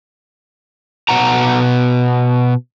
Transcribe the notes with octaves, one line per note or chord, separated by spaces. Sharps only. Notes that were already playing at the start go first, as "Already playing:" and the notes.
B2 F#5 A#5